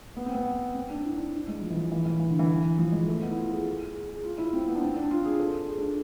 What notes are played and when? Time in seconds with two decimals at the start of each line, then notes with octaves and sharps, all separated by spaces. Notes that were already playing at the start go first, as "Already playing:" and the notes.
0.16 B3
0.26 C4
0.35 B3
0.74 C4
0.90 D4
1.04 E4
1.18 D4
1.48 G#3
1.62 F3
1.70 E3
1.76 F3
1.92 E3
2.06 E3
2.20 E3
2.30 D3
2.39 E3
2.78 F3
2.92 G#3
3.08 A3
3.22 B3
3.31 E4
3.37 F4
3.51 G#4
3.94 G#4
4.09 G#4
4.24 F4
4.38 E4
4.53 C4
4.67 B3
4.75 D4
4.81 C4
4.96 D4
5.11 F4
5.25 G#4
5.40 A4
5.68 G#4
5.78 D4